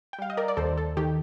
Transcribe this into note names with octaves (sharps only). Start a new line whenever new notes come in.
G5
G3 F5
D#5
A#4 D5
D5
D#2 A4 C5
A4
D#3 G4